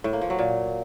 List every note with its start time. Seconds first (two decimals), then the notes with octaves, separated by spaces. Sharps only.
0.04 A2
0.13 A#3
0.21 F3
0.30 F#3
0.39 A#2